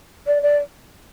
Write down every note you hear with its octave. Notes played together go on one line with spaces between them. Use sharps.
D5
D5